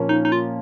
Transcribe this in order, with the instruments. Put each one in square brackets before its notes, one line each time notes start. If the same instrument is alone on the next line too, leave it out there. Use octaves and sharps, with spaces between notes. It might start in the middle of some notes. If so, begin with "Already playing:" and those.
Already playing: [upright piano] A#2 F3 A#3 C#4
[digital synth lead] D#4
D#4
F4